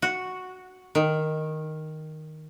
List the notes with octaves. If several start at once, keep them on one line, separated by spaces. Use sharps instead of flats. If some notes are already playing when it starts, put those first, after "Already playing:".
F#4
D#3